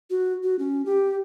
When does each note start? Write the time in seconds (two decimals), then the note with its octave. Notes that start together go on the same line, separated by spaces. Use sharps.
0.10 F#4
0.43 F#4
0.59 C#4
0.86 G4